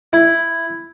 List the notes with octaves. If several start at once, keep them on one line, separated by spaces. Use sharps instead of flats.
E4